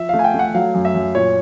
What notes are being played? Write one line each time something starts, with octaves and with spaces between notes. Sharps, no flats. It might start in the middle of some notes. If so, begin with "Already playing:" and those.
Already playing: F3 E5
A3 F5
G#5
G5
A3
F#5
F#3 F5
F#2
E5
F#2
A#2 C#5